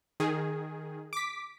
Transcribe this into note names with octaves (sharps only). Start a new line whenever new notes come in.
D#3 G#4
D6 B6